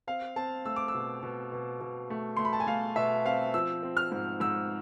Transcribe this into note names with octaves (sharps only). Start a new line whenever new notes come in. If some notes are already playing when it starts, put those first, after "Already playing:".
C4 F5
C4 A5
A3 E6
D6
E6
B2
B2
B2
B2
A3
A3 C6
B5
A5
G#5
A3 F5
B2 E5
C4 F5
F3 E6
C4
F6
G#2
G#2 E6